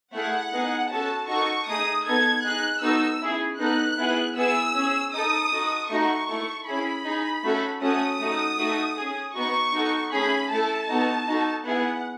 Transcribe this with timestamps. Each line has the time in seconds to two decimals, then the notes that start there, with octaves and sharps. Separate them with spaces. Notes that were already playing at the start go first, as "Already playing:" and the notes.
0.13 A3 E4 G#4 F#5
0.52 B3 D#4 G#4
0.90 C#4 F#4 A4 A5
1.29 D#4 F#4 A4 C#6
1.67 A3 D#4 G#4 D#6
2.06 B3 D#4 A4 G#6
2.44 D#4 G#4 F#6
2.82 B3 D#4 F#4 A4 E6
3.21 C#4 E4 G#4
3.59 B3 D#4 A4 F#6
3.97 B3 E4 G#4
4.36 B3 E4 G#4 E6
4.74 C#4 G#4
5.13 D#4 A4 D#6
5.51 D#4 F#4 A4
5.89 A3 D#4 F#4 C#6
6.28 A3 E4 A4
6.66 C#4 E4 G#4 B5
7.05 D#4 G#4
7.43 A3 C#4 F#4 A4
7.81 A3 C#4 F#4 A4 D#6
8.20 A3 D#4 F#4 A4
8.58 A3 D#4 F#4 A4
8.97 C#4 G#4
9.35 B3 D#4 F#4 C#6
9.74 D#4 F#4 A4
10.12 A3 C#4 G#4 B5
10.51 A3 E4 A4 A5
10.88 B3 D#4 F#4 A4
11.27 D#4 F#4 A4
11.66 B3 E4 G#4 F#5